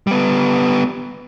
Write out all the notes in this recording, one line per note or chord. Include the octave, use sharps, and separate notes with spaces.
G3 B3